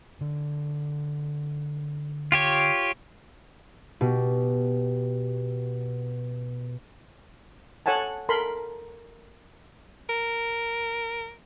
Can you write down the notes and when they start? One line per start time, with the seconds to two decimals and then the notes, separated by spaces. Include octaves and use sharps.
0.21 D3
2.32 F4 G4 C#5
4.01 B2 G4
7.86 A4 C#5 F#5 G#5 A5
8.29 A4 A#4 B5 C6
10.09 A#4